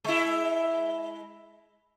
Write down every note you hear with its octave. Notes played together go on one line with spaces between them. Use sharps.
G#3 E4